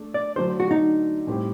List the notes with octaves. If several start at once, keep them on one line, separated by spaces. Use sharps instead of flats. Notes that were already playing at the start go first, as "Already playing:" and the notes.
Already playing: A3 D4
D5
D3 F#3 A3 D4 C5
F#4
D#4
A2 G3 C4 G4